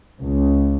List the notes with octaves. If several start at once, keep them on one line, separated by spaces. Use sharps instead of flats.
C#2